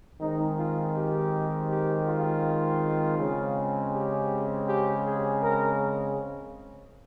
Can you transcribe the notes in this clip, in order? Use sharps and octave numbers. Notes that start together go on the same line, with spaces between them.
D#3 G#3 C4 D#4
F4
G4
G4
F4
C#3 G#3 C4
G4
G4
G#4
A#4